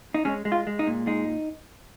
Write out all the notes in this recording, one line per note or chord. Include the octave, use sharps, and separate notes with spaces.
D#4
G#3 C#4
G#3
F4
G#3
D#4
A#2
G#3 D#4